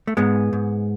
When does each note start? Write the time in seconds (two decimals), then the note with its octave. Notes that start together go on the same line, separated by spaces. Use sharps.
0.07 A3
0.17 G#2 G#3 B3
0.53 G#2